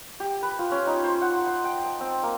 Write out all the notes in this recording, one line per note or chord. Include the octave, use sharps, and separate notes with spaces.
G4
B4
F4
C#4
D#4
C5
F#5
C6
G5
A5
C4
A#3